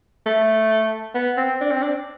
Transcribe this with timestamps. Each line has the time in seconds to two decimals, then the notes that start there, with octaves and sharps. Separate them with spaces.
0.27 A3
1.15 B3
1.37 C4
1.61 D4
1.71 C4
1.82 D4